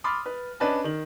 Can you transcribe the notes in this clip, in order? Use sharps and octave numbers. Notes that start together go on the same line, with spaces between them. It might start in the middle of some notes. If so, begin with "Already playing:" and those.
B5 C6 D6 D#6 F6 A6
B4
C#4 D4 B4 D5 D#5 A5
D#3 F#7